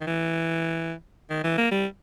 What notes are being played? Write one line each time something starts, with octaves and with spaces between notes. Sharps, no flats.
D#3
E3
D#3
E3
A#3
G3